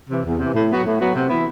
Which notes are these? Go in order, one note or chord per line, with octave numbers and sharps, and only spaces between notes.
C3 E3
E2
C3 E3
A2
F#3 B3 F#4
A2
F#3 B3 F#4
C3
E3 B3 E4